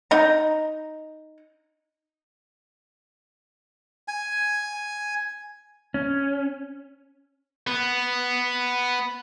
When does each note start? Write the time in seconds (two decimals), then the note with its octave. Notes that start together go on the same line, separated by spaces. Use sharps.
0.11 D#4 A#5
4.08 G#5
5.94 C#4
7.67 B3